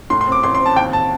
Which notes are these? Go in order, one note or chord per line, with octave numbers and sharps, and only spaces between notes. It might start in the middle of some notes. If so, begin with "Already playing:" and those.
A2 C6
C6
C4 D6
A1 C6
C6
C4
A5
D#2 G5
A5